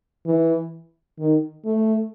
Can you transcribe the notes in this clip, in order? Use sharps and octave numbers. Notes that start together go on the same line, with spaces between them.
E3
D#3
A3